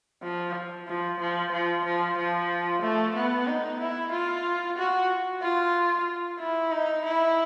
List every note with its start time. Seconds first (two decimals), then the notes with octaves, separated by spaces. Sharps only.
0.23 F3
0.88 F3
1.20 F3
1.52 F3
1.85 F3
2.18 F3
2.82 A3
3.16 B3
3.47 D#4
3.80 E4
4.12 F4
4.78 F#4
5.42 F4
6.39 E4
6.72 D#4
7.05 E4